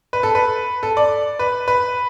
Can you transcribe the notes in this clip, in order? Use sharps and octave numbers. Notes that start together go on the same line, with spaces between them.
B4
A4
B4
A4
D5
B4
B4